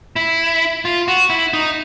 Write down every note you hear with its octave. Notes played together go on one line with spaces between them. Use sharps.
E4
F4
F#4
E4
D#4